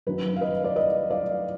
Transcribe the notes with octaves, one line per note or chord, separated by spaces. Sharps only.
F#2 D#3 F#3 B4
F5
B4 D#5
D5
B4 D#5
D5 F5